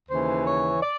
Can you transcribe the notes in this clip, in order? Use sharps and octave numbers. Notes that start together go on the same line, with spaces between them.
D#2 C#3 E3 C5
C#5
D5